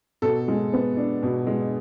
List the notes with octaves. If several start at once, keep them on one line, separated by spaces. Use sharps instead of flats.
B2 A4
G#3
B3
D4
B2
G#3